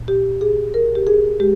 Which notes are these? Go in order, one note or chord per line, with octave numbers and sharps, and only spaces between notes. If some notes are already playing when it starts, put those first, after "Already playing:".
Already playing: A#2
G4
G#4
A#4
G4
G#4
G#3 G4